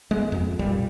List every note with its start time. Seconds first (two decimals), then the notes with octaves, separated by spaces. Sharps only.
0.11 G#3 B3
0.32 F2
0.59 B1 A#2 G3